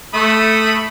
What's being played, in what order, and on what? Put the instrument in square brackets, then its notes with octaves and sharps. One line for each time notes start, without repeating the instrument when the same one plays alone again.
[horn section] A3 [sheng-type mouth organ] B5 D#6